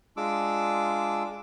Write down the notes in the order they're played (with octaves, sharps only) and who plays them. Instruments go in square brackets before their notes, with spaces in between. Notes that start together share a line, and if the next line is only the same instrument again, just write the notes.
[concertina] G#3 D4 F4 D6 E6